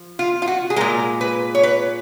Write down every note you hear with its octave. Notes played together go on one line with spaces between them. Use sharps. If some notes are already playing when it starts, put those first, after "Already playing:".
Already playing: F3
F4
F4
F#4
G#4
A#2 G#3 A#4
B4
C#5
B4